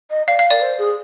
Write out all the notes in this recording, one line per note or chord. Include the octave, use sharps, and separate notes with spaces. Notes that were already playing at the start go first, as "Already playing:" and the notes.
D#5
D5 F5
F5
A#4 D5
C5
G#4